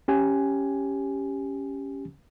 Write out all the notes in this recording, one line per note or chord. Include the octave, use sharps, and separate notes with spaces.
C#4 G4 G#5